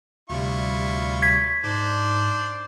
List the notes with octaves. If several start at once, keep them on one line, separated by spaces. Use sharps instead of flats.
D2 C3 G3 E4 F4 C#6
G#6 B6
G#2 D4 C5 D5